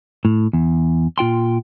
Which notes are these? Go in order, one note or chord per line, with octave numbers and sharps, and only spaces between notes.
A2
E2
A#2 F4 G5 C6